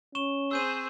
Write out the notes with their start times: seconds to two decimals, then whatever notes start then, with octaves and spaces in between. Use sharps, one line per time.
0.15 C#4 C#6 E7 G7
0.51 C4 G#4 C5 E6 G6 D#7